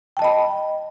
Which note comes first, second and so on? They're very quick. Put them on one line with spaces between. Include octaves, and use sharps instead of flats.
G5 A5 D#5 B5